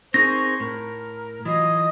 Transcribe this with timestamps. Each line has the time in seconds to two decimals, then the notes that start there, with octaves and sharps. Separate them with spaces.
0.14 C4 D#4 G#4 A#4 C5 C#6 A#6
0.60 A2 A#4
1.45 E3 F#3 F4 D#5 D#6 G#6